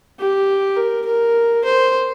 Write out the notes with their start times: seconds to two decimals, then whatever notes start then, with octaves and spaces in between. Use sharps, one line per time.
0.20 G4
0.77 A#4
1.06 A#4
1.65 C5